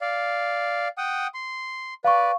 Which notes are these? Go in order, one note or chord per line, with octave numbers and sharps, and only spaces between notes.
D5 F5
F#5 G5 D#6
C6
B4 D5 F5 C#6